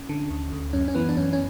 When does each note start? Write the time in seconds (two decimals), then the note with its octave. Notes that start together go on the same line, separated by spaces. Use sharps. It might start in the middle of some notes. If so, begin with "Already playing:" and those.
Already playing: C#4
0.09 D3
0.30 D2
0.52 D2
0.73 F#2 C#4
0.88 C#4
0.95 E3 B3
1.09 D4
1.17 F#2 C#4
1.33 C#4